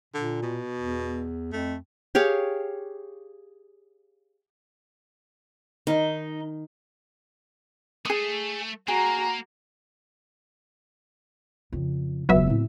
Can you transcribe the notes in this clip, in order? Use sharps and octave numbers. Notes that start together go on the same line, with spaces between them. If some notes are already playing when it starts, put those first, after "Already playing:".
A#2 D3
B2
E2
F2 A3
G4 G#4 C#5 F5
D#3 D#4
A3 G#4 D#6
A#3 F#4 G#4 A#5
F2 C#3
E1 C#2 F#3 B3 E5
A2 C4